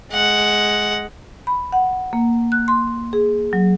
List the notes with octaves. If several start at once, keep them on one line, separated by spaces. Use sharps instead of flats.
G#3 F#5
B5
F#5
A#3
F#6
C6
G#4
F#3